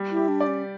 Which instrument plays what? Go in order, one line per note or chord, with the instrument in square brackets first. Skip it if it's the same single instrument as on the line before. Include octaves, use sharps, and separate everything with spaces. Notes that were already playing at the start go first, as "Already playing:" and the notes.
Already playing: [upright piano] G3
[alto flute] E4
[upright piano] G4
[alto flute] D4
[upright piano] D5
[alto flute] C#4